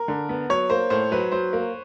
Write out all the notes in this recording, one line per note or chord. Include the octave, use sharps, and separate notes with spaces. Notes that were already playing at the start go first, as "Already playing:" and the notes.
Already playing: A#4
D3
B3
F#3 C#5
A#3 C5
A2 C5
F#3 B4
F#3 C5
A#3